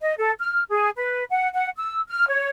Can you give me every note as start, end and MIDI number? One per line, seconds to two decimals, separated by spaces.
0.01 0.14 75
0.17 0.32 69
0.39 0.62 89
0.70 0.90 68
0.97 1.24 71
1.30 1.48 78
1.53 1.68 78
1.77 2.01 88
2.08 2.26 89
2.27 2.49 73